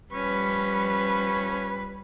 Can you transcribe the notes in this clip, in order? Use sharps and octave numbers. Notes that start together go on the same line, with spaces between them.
F3 G3 C#4 B4 C#6